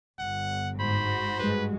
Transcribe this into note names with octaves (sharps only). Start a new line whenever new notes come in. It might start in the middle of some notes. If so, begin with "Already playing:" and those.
G1 F#5
G#2 F#4 C5 B5
G2 G#3 B4